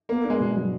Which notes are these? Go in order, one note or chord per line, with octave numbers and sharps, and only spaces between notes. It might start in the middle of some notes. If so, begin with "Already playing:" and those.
A#3 B3
D4
G#3
B2
F#3